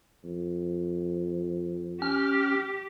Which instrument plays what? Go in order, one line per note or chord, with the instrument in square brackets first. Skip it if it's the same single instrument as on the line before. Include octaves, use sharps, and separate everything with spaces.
[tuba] F2
[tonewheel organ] C#4 F6 [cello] G4